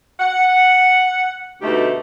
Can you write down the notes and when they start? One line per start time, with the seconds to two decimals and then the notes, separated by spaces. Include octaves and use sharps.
0.20 F#5
1.62 D2 B2 A3 D#4 G4